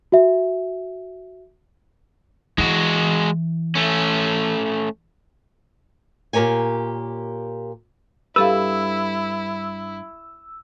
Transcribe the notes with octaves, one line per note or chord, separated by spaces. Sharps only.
F#4 E5
E3 G#3 F#4
A3 C#4
A#2 G4 A#4 C#5 G#5
G2 E4 G4 A4 B4 F5 E6